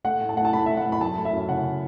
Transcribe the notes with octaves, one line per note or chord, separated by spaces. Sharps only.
A3 F#5
A2
A5
A2 F#5
A5
A3 B5
A3 E5
F#5
A2
B5
F#2 A5
A3
E5
F#2
C#3 F#5